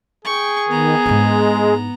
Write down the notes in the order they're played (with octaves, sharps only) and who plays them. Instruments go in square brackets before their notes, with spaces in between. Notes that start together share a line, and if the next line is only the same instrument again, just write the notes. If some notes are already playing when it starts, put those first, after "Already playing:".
[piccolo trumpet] G#4 [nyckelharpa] G5 C#6
[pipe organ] D#3 [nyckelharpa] B3 A#5
[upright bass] G#2 D4 [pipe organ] G#3